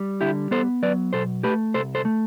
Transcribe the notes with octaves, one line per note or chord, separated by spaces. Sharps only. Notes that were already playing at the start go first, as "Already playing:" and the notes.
Already playing: G3
D3 E4 G4
B3 A4 C5
F#3 B4 D5
B2 A4 C5
A3 G4 B4
C2 A4 C5
A4 C5
A3